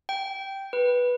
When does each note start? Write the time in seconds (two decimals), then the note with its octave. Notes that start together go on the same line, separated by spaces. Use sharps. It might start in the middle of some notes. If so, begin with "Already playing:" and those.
0.09 G5
0.73 B4